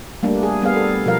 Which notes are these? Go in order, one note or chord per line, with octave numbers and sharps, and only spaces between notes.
G3 A3 A#3 D4
G#4
G3 B3 G#4 F5
A4
B2 F3 A#4 F5